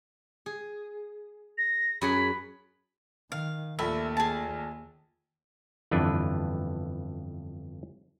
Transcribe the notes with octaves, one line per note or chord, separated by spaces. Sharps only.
G#4
A#6
F#2 G#4 F#5 B5
D#3 F5
A#1 D#2 A3 E5 B5
G#4 A5
G1 F2 E3 D4 B4